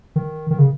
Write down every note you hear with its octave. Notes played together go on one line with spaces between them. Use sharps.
D#3
D#3
C#3